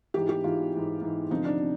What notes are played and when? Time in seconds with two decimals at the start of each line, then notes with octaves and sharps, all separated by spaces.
0.14 G#2 E3 G4
0.29 G4
0.44 G#2 E3 F4
0.73 G#2 E3
1.01 G#2 E3
1.31 D2 C3 F3 D#4
1.45 D4
1.61 C3